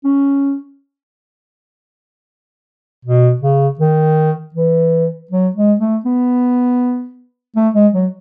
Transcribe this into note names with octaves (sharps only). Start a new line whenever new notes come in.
C#4
B2
C#3
D#3
E3
F#3
G#3
A3
B3
A3
G#3
F#3